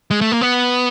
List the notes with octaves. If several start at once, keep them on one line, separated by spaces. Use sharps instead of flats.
G#3
A3
A#3
B3